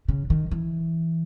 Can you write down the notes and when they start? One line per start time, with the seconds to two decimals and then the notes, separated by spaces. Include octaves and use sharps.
0.08 C#3
0.30 D#3
0.51 E3